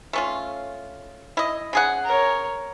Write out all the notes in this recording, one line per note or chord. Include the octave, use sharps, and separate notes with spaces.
A3 C#4 F4
E4 D#5
C#3 G#4 F#5
A#4 C#5